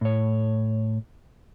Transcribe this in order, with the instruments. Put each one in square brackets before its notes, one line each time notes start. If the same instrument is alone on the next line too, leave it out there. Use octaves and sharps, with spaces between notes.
[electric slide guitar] A2 C#5